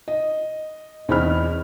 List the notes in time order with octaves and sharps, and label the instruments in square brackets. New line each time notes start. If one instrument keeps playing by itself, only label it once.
[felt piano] D#5
E2 C4 E4 D#5 B5 F6